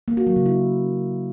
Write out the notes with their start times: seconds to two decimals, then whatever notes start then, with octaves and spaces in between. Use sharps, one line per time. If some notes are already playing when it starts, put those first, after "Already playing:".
0.08 A#3
0.17 F#4
0.27 F#3
0.36 C#3
0.46 E4